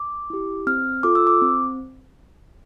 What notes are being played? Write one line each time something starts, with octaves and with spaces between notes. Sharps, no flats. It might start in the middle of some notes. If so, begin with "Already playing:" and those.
Already playing: D6
E4 G4
C4 F6
F4 A4 D6
E6
D6
C4